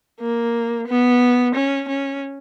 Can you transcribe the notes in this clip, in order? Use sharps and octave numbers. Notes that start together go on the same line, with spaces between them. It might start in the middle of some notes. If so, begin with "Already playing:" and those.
A#3
B3
C#4
C#4